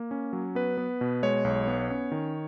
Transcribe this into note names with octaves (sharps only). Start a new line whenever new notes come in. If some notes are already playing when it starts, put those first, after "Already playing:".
Already playing: A#3
C#4
F#3
B3 B4
B3
B2
G#3 C#5
B1
B3
C#4
D#3